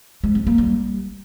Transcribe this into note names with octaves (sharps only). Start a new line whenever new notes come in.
G#3
C4
A#3
G3